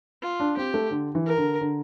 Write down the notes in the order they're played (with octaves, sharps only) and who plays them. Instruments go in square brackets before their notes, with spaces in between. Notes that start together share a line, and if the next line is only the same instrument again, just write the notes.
[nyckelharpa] F4
[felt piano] D4
[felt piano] C4 [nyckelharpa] G4
[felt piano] A3
D3
E3
[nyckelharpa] A#4
[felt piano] D3
D3